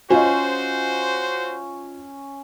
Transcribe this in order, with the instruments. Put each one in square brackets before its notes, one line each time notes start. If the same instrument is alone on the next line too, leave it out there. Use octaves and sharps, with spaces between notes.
[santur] C#4 [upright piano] F4 D#5 [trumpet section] F#4 C5